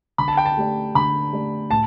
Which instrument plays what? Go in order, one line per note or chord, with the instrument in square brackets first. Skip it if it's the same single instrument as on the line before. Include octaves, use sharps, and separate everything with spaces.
[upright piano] D3 [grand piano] B5
[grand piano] A5
G5
A5
[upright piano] A3 G4 D5
[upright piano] D3 [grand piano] B5
[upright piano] A3 G4 D5
[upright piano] A2 [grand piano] A5